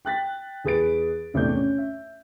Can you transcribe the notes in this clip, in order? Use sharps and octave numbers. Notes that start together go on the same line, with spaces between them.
G5 F#6 A6 B6
E2 G#4 B4 A6 D7
A1 E2 C3 A3 D4 G6
C#4
E5